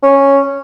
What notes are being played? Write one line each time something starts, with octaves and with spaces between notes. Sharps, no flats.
C#4